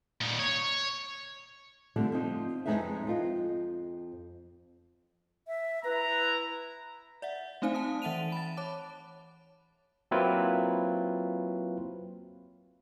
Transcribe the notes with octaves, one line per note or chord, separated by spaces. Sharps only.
A#2 D#4
C#5
D3 F3 G3 A3 C4
F3 C4 D#4
F2 F#3 G#3 D#4 B4 E5
F2 F4 D#5
E5
E4 B4 A#5
D5 E5 F#5
A3 C4 D#4 C5 F5 G#5
A5 D#6
E3 E5 F#5 A5 D#7 F7
B5 A6
C#5 A5 D6
F#3 A#3 C4 E4 F4 B4